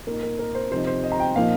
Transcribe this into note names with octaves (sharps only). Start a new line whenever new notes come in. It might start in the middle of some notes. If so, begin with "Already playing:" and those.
A#2 A#3 D#4 A#4
A#4
A#4
C5
C3 F3 C4 D#4 C5
C5
D#5
A#5
G5
A#2 F3 A#3 D#4 F5